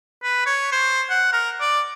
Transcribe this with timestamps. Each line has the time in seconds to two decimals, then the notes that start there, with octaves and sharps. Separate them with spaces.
0.23 B4
0.46 C#5
0.72 C5
1.10 F#5
1.32 A#4
1.60 D5